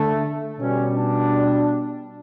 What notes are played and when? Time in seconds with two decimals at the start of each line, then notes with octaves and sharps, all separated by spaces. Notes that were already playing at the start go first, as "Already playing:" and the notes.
Already playing: D3 A3
0.60 B2 G3 C#4
0.97 D4